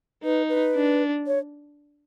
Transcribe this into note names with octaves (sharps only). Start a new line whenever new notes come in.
D#4 B4
B4
D4
C#5